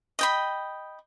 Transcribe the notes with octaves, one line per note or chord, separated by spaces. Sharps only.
D#5 G5 B5